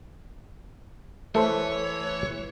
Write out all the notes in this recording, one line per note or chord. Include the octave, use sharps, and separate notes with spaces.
E3 A3 A4 C5 C#5